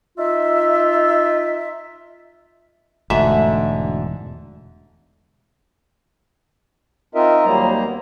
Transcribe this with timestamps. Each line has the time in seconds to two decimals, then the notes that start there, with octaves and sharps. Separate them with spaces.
0.18 D#4 F4 E5
3.10 E1 G#2 D3 A3 F#4 E5
7.15 C4 D#4 F4 A#4 D#5 E5
7.45 D#2 F#3 G3 A#3 C5 A#5
7.84 B3